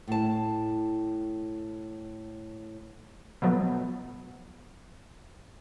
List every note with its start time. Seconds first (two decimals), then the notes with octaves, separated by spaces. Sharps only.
0.08 A2 A5
3.42 B2 F3 F#3 A3 B3